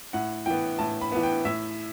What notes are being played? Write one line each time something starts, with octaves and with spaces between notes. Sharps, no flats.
A2 F#5
E3 B3 G5
A2 A5
B5
E3 B3
G5
A2 E5